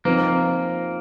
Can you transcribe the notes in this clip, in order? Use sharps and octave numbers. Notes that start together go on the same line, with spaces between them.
F3 A#3 C4 D#4